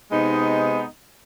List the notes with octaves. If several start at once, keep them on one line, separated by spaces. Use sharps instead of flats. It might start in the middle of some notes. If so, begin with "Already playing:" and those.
C3 G#3 B3 D#4